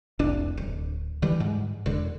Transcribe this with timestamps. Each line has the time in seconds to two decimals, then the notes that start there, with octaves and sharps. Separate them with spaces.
0.19 F1 C2 D4
0.57 D1
1.22 D3 E3 G3
1.40 G#2
1.86 E1 D3